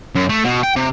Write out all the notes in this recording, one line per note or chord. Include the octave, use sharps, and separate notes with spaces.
F#2
A3
B2
G5
C3